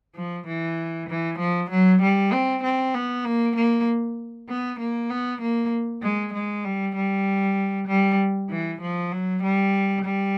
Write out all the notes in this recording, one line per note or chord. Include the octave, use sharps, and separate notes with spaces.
F3
E3
E3
F3
F#3
G3
C4
C4
B3
A#3
A#3
B3
A#3
B3
A#3
G#3
G#3
G3
G3
G3
E3
F3
F#3
G3
G3